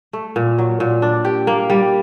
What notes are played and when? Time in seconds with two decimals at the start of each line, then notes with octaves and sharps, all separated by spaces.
0.13 A3
0.36 A#2
0.58 F#3
0.80 A#2
1.02 D4
1.25 G4
1.47 A#3
1.70 G3